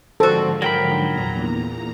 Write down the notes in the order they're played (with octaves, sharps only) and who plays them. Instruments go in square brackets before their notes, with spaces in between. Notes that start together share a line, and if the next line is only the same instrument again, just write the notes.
[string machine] G#2 D3 F3 [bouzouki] C4 F#4 [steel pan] A4
[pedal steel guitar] F#3 G5 B5 [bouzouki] A#4
[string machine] E2 A#2 A#5